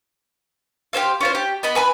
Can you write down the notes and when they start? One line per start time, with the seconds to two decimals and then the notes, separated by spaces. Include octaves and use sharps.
0.93 G4 G#4 C5 F5
1.21 C#4 F4 C5
1.35 G4
1.63 B3 D#5 B5
1.75 B4 G#5 B5